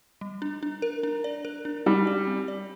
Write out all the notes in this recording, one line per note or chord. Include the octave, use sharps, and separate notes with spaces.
G3
D4
D4
A#4
D4
D5
A#4
D4
G3 D5
D5
C4
D5